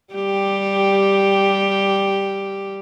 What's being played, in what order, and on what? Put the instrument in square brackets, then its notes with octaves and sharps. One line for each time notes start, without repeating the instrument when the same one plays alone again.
[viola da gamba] G3 G4